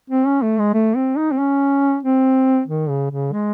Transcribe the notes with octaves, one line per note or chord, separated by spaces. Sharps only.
C4
C#4
A3
G#3
A3
C4
D#4
C4
C#4
C4
D#3
C#3
C#3
G#3